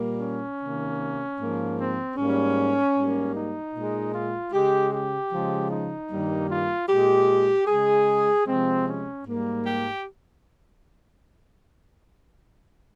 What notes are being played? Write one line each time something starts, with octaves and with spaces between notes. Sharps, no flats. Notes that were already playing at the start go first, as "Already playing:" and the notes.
Already playing: A#2 G3 A#3
C#4
C3 D#3 A#3
G#2 F3 A#3
C4
G#2 G3 A#3 C#4
G#2 G3 A#3
D#4
A#2 G#3
F4
C#3 G#3 G4
G4
C#3 F3 G#3
D#4
G2 D#3 G3 A#3
F4
A#2 G#3 G4
C#3 G#3 G#4
C3 F3 G#3 C4
C#4
G#2 G3 A#3
G4